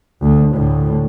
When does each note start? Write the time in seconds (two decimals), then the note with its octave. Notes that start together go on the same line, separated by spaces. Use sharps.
0.22 D2
0.55 D2 A2